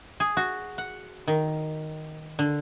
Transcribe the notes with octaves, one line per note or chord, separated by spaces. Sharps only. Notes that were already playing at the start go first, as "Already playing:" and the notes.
G#4
F#4
F#5
D#3
D3